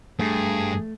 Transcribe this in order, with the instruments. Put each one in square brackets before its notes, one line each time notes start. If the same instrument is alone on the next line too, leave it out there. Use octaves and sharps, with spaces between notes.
[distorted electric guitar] G2 [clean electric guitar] A3 [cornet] G#4